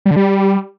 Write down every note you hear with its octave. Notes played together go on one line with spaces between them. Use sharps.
G3
D3
G3